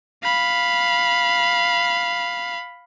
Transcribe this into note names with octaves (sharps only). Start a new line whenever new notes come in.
F5 B5